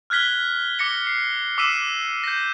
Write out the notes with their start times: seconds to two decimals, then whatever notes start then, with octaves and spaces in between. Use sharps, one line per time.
0.10 F6 F#6 G#6 B6 G7
0.79 D6 A#6 C#7 G7
1.07 C7
1.58 D6 E6 B6 C7 D#7 E7
2.24 G6 A#6